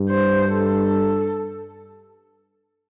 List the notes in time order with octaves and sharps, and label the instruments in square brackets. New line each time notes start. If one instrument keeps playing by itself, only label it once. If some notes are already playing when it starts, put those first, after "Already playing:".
Already playing: [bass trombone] G2
[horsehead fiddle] C5
A4